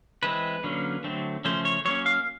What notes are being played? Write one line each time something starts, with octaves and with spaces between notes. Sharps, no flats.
E3 G#3 C4 B4
D3 F#3 A#3 C#4
D3 F#3 A3 C4
C#3 F3 A3 C#4 C5
C#5
F#3 A#3 C#4 C#5
F5